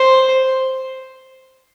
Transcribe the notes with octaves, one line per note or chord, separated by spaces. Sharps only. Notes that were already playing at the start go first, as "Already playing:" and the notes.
Already playing: C5